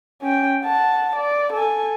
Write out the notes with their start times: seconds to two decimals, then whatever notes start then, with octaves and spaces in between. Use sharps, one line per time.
0.22 C#4 G5
0.62 F#5 A5
1.16 D5
1.53 A4 G#5